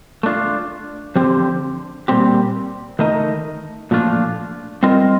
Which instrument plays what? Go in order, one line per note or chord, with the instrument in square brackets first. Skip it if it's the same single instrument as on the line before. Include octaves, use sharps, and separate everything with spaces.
[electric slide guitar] A3 D4 F4
D3 F3 C4 G4
A#2 G3 C4 G4
D#3 A3 D#4 A#4 D#5
A#2 F3 A3 D4 F4
G3 C4 F4 A#4 D#5